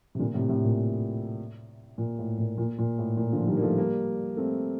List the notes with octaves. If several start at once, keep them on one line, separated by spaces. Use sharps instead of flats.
C3
A#2 D3
A2 C3
A2 C3
A#2
A#2
A2
A#2
A#2
A#2
A2
A#2
D3 F3
D#3 G3
A#3
F3 A3
G3 A#3
A3 C4